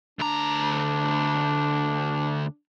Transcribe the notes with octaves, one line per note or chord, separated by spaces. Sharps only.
D2 D4 A#5